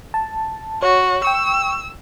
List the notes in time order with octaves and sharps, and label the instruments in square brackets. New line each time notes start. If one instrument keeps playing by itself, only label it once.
[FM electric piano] A5
[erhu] F#4 [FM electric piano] C#5
[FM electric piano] G5 C#6 [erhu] E6